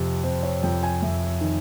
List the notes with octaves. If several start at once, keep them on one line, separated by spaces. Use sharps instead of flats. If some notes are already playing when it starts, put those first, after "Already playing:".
Already playing: F2 C3
C3 C5
C#5
F2 G5
G#5
F2 E5
D#3